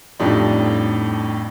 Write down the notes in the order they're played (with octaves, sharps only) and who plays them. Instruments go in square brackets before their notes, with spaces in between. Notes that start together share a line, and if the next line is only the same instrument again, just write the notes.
[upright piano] F2 A2 F3 G3 D4 D#4